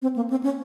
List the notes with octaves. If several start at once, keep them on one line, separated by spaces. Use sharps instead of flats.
C4
A#3
C4
C#4